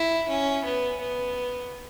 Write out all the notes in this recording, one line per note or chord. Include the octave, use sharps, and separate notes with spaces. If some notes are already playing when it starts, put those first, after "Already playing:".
Already playing: E4
C#4
B3
B3